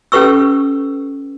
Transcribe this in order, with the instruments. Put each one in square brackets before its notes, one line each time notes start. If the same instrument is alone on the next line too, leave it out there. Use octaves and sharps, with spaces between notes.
[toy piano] C#4 G4 A4 B4 C#6 E6